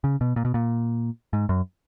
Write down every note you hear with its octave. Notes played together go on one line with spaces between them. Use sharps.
C#3
B2
A#2
B2
A#2
G#2
F#2